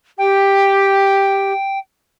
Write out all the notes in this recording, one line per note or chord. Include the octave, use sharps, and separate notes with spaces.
G4 G5